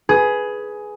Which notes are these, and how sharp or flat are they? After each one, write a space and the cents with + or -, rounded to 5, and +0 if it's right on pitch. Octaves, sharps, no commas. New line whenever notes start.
G#4 +10 B4 +0